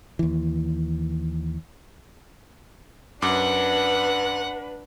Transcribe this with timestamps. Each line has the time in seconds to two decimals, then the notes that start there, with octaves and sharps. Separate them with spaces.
0.19 D#2 E3
3.22 F#2 D4 B4 F#5 D6